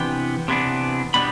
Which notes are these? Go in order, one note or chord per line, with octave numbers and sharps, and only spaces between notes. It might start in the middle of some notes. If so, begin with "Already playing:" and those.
Already playing: C3 E3 B3 D4 G5
C3 E3 B3 D4
B2 G3 B3 D4 B5